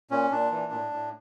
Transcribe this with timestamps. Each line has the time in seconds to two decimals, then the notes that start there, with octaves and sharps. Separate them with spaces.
0.11 A#2 C#4
0.31 A#2 D4
0.51 E3
0.72 A2
0.93 A2